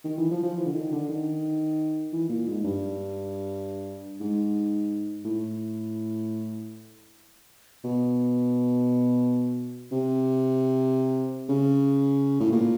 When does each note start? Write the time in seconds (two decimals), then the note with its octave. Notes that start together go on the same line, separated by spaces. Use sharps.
0.04 D#3
0.17 E3
0.31 F3
0.43 F3
0.56 E3
0.66 D3
0.73 D#3
0.92 D3
1.09 D#3
2.12 E3
2.29 A#2
2.47 G#2
2.64 G2
4.20 G#2
5.25 A2
7.84 B2
9.92 C3
11.49 C#3
12.40 A2
12.52 A#2